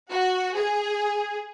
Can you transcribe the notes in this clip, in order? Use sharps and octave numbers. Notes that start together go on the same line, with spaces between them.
F#4
G#4